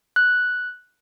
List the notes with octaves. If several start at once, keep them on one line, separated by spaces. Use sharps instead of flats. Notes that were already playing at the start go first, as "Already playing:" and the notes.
F#6